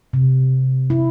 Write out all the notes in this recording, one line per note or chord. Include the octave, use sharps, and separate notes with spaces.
C3
E4